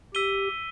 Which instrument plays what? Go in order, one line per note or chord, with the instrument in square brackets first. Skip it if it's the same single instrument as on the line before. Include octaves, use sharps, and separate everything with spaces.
[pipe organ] G4 [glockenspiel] E6 B6 D#7 G7